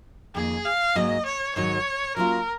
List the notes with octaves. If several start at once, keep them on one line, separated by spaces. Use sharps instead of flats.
F2 D#3 A#3 D#4 G#4
F5
G#2 F#3 A#3 D#4 D#5
C#5
G#2 D#3 F#3 C#5
F#3 A#3 C#4 F4 G#4 A#4